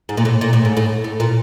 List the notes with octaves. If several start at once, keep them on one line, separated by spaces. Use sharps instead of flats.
G#2
A#2
A2
A#2
A2
G#2
A2
A2
A#2